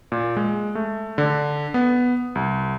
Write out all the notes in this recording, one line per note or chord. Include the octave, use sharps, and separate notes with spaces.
A#2
G#3
A3
D3
B3
C2